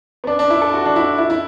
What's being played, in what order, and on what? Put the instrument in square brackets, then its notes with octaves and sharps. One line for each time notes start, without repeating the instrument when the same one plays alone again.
[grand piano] B3
D4
D4
E4
A4
F#4
D4
E4
E4
E4